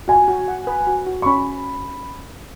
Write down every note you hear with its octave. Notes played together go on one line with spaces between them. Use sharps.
F#4 G#5
F#4
F#5
B4
F#4
F#4
C#6
C#4 B5